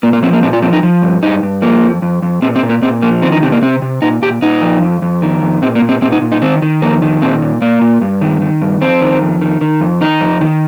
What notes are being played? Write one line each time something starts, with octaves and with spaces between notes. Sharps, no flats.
A#2 A#3
A#3
F3 C4
A#3
A#2 C4
F4
F3 C4
D#4
F3
G2
G2 D#4
G2
F3 A#3
F2
F2
F2
A#2 C4
C4
A#2
A#3
A#2 C4
F3 A#3
D#3 C4
D#4
C3 C4
A#3
C3 C4
C3
A#2 D#4
A#2 G4
A#2 D#4
F3
F2
F2
D#3
F2
A#2 C4
A#3
A#2
C4
A#2 C4
D#4
A#2
D#4
D#3 C4
D#3
F2 A#3
D#3
A#2 C4
A#2
A#2 A#3
A#2
G2
D#3
D#3
G2
F2 C4
D#3
F2
D#3
D#3
F2
D#3 D#4
F2
D#3